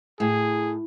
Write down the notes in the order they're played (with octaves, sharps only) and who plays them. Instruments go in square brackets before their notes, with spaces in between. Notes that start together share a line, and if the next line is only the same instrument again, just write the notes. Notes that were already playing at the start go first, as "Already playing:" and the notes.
[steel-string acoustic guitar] A2 [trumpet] G#4